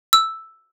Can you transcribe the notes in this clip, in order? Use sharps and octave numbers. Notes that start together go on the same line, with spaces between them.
E6